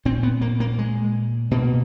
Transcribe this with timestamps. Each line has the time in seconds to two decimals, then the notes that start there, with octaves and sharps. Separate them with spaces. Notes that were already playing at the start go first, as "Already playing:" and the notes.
0.05 A#2 C4
0.23 B3
0.41 A#3
0.60 A#3
0.79 G#3
1.51 B2 A#3